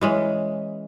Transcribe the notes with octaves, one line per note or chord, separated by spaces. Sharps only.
E3 G#3 C#4